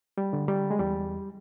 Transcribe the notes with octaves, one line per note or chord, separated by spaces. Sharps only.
G3
D3
G3
G#3
E2 G3